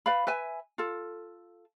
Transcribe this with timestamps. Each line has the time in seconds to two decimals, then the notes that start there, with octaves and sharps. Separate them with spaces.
0.06 B4 D5 F5 B5
0.27 B4 E5 G#5
0.78 F4 A4